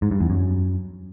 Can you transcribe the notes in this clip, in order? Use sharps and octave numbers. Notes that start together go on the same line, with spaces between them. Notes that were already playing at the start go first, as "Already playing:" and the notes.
G#2
G2
E2
F#2